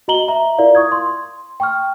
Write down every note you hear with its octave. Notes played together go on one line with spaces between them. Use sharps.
F#4 D#5 A#5 F#7 G7
E5 A#5
E4 F4 A#4 D5 F5
C#6 D#6 G#6
C6
G5 C#6 F6